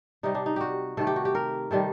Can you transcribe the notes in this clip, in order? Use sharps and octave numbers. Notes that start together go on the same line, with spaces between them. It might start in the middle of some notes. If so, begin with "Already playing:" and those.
C3 G3 D#4
D4
D#4
F#4 G4
C3 D#3 A3 A4
G4
F#4
G4
A#4
C3 D#3 G3 A4